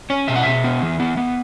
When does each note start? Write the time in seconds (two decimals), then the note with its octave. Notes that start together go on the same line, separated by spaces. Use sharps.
0.10 C#4 C#5
0.28 B2 E5
0.36 F#5
0.43 B2 E5
0.64 B3
0.82 E3
1.00 B3
1.17 B3